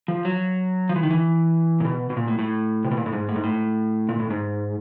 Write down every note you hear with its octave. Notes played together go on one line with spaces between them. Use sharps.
F3
F#3
F3
E3
D#3
E3
A#2
B2
B2
A#2
A2
A2
C3
B2
A#2
A2
G#2
A2
G#2
A2
A#2
A2
G#2